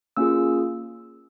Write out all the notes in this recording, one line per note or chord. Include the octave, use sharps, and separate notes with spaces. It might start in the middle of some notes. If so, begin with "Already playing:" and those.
A#3 C#4 F4 G#4 E6